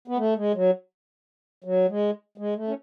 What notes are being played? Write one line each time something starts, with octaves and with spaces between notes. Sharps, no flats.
B3
A3
G#3
F#3
F#3
G#3
G#3
A3
C#4